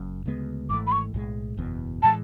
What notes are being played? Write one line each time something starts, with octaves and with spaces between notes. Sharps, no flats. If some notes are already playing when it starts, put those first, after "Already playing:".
Already playing: F#1 F#2
D2 C#3 G#3 B3
G#1 G#2 E3 A3 D6
B5
C#6
B1 A2 E3 G#3
F#1 E2 B2
A2 E3 G#3 A5